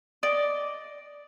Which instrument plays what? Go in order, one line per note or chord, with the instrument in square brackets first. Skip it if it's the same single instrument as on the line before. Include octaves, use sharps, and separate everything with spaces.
[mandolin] D5 D#5